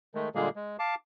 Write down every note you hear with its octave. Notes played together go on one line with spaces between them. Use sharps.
D#3 G#3 A3
A#2 D3 G3 G#3 A#3 G#4
G#3
F5 A5 D6